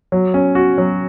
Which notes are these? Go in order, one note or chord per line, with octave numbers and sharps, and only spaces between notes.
F#3
C#4
F#4
F#3